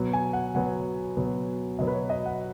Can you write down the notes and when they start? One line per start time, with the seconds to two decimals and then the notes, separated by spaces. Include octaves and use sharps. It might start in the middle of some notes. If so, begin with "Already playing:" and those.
Already playing: B2 F#3 B3
0.13 G#5
0.33 F#5
0.54 B2 F#3 B3 F#5
1.17 B2 F#3 B3
1.79 B2 F#3 B3 D#5
1.87 B4
1.94 C#5
2.10 D#5
2.26 F#5